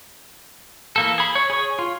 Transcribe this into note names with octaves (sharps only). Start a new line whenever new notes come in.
E3 A#3 A4
G#4 B5
C#5
G#4 C#5
F4